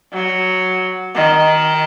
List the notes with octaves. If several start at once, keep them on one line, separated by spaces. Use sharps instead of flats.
F#3
D#3